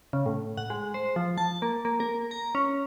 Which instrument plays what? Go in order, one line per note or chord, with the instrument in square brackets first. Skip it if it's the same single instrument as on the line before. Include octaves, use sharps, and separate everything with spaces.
[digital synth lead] C#3
A2
F#5
G#3
C5
F3
A5
A#3
A#3
A#4
A#5
C#4